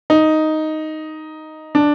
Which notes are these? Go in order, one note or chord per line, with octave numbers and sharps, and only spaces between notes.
D#4
D4